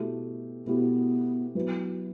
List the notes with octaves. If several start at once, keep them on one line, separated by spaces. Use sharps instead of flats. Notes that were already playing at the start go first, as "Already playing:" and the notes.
Already playing: B2 A3 E4 G4
B2 A3 B3 E4 G4
F#3 B3 E4 B4